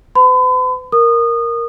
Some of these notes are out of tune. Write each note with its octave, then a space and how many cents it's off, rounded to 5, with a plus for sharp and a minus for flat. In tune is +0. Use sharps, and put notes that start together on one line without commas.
B4 +45 B5 +40
A#4 +0 D#6 -25